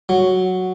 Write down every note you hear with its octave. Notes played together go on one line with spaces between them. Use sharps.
F#3